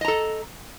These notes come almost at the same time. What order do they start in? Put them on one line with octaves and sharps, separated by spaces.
D#5 A#5 A4